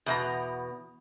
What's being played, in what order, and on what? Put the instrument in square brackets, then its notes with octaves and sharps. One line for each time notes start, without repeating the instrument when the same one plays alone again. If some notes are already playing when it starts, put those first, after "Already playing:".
[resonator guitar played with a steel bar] E2 B2 D#4 A#5